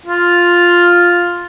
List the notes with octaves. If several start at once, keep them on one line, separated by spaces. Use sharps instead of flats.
F4